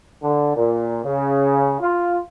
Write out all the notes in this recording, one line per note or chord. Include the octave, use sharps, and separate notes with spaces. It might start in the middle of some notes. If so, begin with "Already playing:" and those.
D3
A#2
C#3
F4